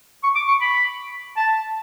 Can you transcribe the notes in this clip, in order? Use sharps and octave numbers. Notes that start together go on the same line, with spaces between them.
C#6
D6
C#6
B5
A5